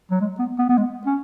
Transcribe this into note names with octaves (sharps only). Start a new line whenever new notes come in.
F#3
G#3
B3
B3
B3
G#3
C#4